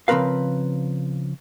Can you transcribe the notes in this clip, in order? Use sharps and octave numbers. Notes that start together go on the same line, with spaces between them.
C#3 F3 C4 A#4 B4 F5